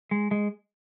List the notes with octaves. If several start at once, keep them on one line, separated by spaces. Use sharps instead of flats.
G#3
G#3